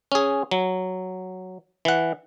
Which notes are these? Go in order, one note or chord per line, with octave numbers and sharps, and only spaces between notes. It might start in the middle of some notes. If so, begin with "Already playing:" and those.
C#4 G#4
F#3
E3 F#5